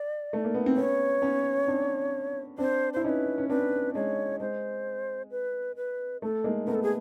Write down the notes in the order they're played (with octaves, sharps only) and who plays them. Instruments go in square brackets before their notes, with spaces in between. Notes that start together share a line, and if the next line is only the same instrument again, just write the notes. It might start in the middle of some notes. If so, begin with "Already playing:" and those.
Already playing: [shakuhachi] D5
[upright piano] A3
A#3
B3
C4
[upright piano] B3 C#4 [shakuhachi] C#5
[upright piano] B3 C#4
C4 D4
[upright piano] C4 D4 [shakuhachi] C5
[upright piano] E4 [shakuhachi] C5
[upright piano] C#4 D#4 [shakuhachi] B4 C5
[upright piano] C#4
[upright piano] C4 D4 [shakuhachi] B4
[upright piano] G#3 [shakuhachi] C#5
[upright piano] G#3 [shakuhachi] C5
[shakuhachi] B4
B4
[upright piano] A3 [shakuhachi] A4
[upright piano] G#3 A#3
[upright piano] A3 B3 [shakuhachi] A#4
[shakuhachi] A4
G#4